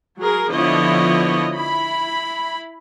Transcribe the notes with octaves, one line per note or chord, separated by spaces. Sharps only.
F#3 G#4 A#4
D3 F3 B3 E4 C#5 D#5
E4 B5